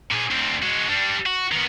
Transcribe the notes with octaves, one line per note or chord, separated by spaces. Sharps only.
A#2 G#4
D2 C4
G#3 F#4
G3 D4
F#4
D#3 B3